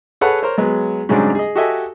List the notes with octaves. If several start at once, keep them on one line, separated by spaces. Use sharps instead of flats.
G#4 A4 B4 C#5 F#5 A5
A#4 C5 C#5
F#3 G#3 B3
G#2 C#3 F#3 G3 C4 D4
G#4 D#5
F#4 G4 A4 D#5 E5 G#5